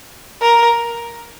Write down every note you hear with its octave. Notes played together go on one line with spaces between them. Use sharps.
A#4